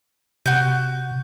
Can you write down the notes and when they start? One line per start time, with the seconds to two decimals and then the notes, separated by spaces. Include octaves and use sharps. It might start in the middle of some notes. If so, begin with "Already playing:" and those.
0.46 C3 F#4 G6